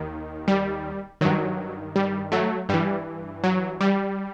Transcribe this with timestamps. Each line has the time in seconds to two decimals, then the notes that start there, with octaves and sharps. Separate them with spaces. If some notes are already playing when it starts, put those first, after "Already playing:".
Already playing: D#2 D#3
0.48 G3
1.21 G2 D#3 F#3
1.96 G3
2.32 F#3 A3
2.69 G2 E3 G3
3.44 F#3
3.81 G3